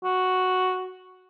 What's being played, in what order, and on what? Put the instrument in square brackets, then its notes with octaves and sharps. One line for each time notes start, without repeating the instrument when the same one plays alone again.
[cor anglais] F#4